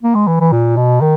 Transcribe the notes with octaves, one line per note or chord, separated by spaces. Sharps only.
A#3
G#3
E3
E3
A#2
B2
D#3